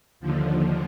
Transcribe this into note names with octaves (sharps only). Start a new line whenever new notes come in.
D#2 D3 F3